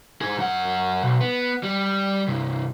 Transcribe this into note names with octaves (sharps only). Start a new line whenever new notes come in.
G#2 G#4
F#2 F#5
B1
B3
G3
C2 G2